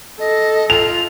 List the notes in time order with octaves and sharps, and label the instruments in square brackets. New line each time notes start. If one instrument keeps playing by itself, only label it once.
[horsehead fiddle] A4 [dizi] D#5
[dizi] F4 [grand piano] F7